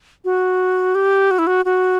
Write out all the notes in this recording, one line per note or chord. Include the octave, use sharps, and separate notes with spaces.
F#4
G4
F#4
E4
F#4
F#4